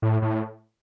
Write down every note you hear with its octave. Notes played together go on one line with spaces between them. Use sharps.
A2
A2